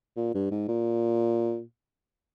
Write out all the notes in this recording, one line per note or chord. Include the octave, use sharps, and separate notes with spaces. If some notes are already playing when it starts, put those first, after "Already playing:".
A#2
G2
G#2
A#2